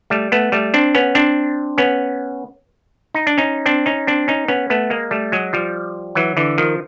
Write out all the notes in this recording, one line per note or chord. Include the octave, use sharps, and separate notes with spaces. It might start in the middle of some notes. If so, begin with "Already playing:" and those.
G3 A3
A3 B3
G3 A3
C4 D4
B3 C#4
C4 D4
B3 C#4
D#4
D4
C#4 D#4
C4 D4
C#4 D#4
C4 D4
C#4 D#4
B3 C#4
A3 B3
G#3 A#3
G3 A3
F#3 G#3
F3 G3
E3 F#3
D3 E3
D#3 F3